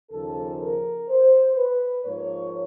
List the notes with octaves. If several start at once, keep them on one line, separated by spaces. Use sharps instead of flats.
D#2 C#3 F3 A4
A#4
C5
B4
G#2 F3 A#3 C#5